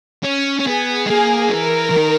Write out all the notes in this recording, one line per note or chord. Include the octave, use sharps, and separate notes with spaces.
C#4
C#4
B3 G#4
G#3
A#3 G#4
F#3
E3 A#4
E3
D#3